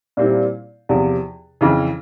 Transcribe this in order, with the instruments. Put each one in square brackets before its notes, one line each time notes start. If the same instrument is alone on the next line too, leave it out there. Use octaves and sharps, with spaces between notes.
[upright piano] A#2 G3 C4 E4
E2 C3 F3
F2 C#3 E3